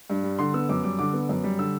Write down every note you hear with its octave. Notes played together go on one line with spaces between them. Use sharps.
G2
G3
D3 C6
B3 E6
F#2 D6
G3 D6
D3 D6
B3
F#2
G3
D3 E6